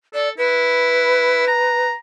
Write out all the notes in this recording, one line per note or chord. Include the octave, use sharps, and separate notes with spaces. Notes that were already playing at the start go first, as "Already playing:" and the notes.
A4 D5
E4 B4
A#5